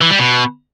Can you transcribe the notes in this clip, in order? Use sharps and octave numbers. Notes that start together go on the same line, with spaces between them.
E3
G3
B2